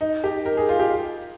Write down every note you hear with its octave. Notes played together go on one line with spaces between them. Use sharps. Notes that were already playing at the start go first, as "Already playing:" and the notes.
D#4
G4
A#4
G#4
F4
G4